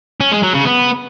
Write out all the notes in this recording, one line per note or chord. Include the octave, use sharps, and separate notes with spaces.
C#4
G#3
F#3
C#3
B3